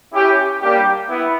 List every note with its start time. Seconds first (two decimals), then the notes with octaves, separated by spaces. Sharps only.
0.13 C#4 E4 G4
0.61 G3 A#3 D4 G4
1.09 B3 E4